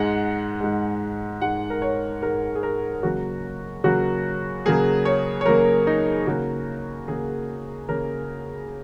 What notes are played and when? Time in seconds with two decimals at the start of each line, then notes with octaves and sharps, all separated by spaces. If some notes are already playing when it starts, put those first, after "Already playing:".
Already playing: G#2 G#3 F#5
0.60 G#2 G#3
1.41 G#2 G#3 F#5
1.70 A#4
1.82 C#5
2.22 G#2 G#3 A#4
2.56 G#4
2.63 A#4
3.03 C#3 F#3 A#3 F#4
3.84 C#3 F#3 A#3 F#4
4.65 C#3 F#3 A#3 G#4
5.05 C#5
5.41 C#5
5.46 C#3 F#3 A#3 A#4
5.87 D#4
6.27 C#3 A#3 F#4
7.08 C#3 A#3 G#4
7.89 C#3 A#3 A#4